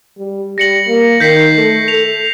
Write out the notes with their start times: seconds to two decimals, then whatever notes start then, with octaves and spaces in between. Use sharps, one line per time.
0.18 G3
0.58 G3 A#6 C#7 F#7
0.87 A#3
1.20 D#3 G6 B6 C7
1.57 A3
1.88 A4 F7